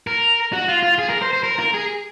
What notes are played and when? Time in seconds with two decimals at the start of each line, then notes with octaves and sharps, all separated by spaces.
0.07 A#4
0.53 F#4
0.68 F4
0.83 F4
0.99 G#4
1.09 A#4
1.22 C5
1.33 C5
1.43 A#4
1.59 A#4
1.74 G#4